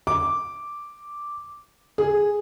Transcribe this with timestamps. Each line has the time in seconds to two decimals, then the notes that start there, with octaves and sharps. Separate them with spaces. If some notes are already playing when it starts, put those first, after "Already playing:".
0.07 D6
1.98 G#4